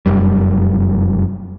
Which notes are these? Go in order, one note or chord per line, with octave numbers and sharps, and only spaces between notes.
F1 F#2 G3